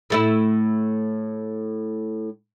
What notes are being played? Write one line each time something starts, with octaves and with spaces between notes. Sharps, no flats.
A2 A3 E4